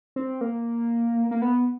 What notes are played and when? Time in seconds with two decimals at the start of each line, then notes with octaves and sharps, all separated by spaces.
0.16 C4
0.41 A#3
1.31 A#3
1.42 B3